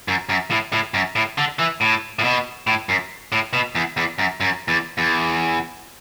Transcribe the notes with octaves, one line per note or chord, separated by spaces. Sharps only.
F#2
F#2
A2
A2
F#2
A2
D3
E3
A2
A2
B2
A2
F#2
A2
B2
E2
E2
F#2
F#2
E2
E2